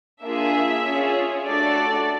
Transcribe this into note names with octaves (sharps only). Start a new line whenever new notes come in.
A#3 D4 F4 G#4 E5
C#4 F4 G#4
A3 D4 F#4 A4 D5